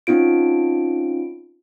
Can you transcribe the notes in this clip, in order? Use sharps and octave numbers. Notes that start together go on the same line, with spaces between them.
C4 C#4 D#4 F4 D7